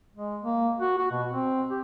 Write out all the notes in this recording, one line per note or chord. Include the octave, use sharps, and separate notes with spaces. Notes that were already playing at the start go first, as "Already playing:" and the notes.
G#3
A#3
F#4
F#4
B2
C4
G4